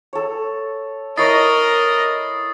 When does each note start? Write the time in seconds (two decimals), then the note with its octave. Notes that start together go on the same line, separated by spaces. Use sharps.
0.13 A4 C#5
1.17 E4 A#4 C#5 D#5 D#6 A6 C7